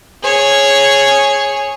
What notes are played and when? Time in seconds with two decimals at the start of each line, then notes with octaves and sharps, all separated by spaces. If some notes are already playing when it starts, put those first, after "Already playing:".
0.22 G#4 C#5